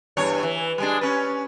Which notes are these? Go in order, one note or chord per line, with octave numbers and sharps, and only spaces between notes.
E2 G2 C#5
E3
G3 G#3 D4
C#4 B4